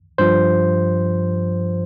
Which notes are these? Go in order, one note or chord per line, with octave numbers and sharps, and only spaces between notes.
G2 F3 C5